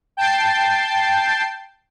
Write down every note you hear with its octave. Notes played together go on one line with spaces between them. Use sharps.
G5 A5 G6 A6 C7